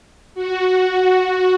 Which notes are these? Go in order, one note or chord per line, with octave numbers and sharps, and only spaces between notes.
F#4